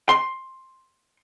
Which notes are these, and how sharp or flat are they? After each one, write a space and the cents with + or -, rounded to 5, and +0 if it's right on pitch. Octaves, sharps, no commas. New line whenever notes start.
C6 +10